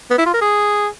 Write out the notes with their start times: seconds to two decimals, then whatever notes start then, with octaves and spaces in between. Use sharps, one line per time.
0.10 B3
0.18 E4
0.26 F4
0.34 A#4
0.41 G#4